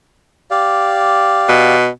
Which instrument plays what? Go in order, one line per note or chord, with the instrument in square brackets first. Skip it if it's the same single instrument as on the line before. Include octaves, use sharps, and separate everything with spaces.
[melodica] G4 D5 F5
[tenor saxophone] B2